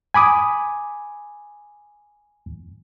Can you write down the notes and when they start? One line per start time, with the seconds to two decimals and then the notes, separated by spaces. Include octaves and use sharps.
0.14 G#5 B5 D6 D#6